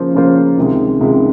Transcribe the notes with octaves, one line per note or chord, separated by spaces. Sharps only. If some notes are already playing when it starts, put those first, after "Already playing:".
Already playing: C#3 F3 A#3 F4 C5
C#3 F3 A#3 F4 C5
C#2 C3 D#3 G#3
C#2 C3 D#3 G#3